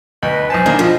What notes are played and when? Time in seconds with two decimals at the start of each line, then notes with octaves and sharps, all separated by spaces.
0.23 D2 B4 D#5
0.50 B1 C5 G#5 A5
0.66 E2 D#3 A#3 D4
0.79 B2 F3 D#5